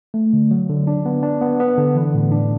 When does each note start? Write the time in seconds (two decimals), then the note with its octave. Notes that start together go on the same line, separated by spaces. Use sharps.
0.14 A3
0.33 D3
0.51 F#3
0.69 D3
0.87 D4
1.06 B3
1.23 D4
1.41 B3
1.60 B3
1.78 D3
1.95 E3
2.14 A2
2.32 D4